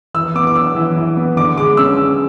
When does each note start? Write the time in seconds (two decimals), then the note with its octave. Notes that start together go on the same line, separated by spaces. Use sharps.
0.14 E3 E6
0.35 B3 D6
0.47 D6
0.55 D4 E6
0.76 E3
0.96 E3
1.17 B3
1.37 D3 D6
1.57 G#3 D6
1.77 C#4 E6